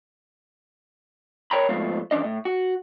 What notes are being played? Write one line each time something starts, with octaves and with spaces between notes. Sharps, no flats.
A#4 C#5 G5 A#5 B5
F2 G#2 B2 A3 F4
G2 E3 C#4 D4 D#5
A2
F#4